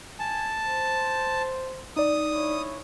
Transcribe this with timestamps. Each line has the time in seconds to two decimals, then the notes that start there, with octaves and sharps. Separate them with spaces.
0.19 G#5 A5
0.64 C5
1.96 D#4 D5 D#6
2.32 D4 E4 C#5